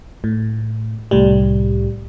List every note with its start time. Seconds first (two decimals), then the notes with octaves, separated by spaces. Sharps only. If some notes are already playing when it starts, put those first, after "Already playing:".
0.24 A2
1.11 C2 A2 G3